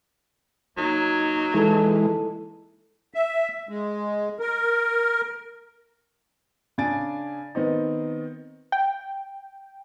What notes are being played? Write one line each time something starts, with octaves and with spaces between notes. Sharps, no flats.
F#3 A#3 D#4
E3 G#3 E4 A4
E5
G#3
A#4
C#3 D4 G#5 A6 D7
D#3 B3 C4 D#4
G5